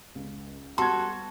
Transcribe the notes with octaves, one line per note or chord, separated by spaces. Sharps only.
C#2
G3 B3 F#4 A4 C6 G#6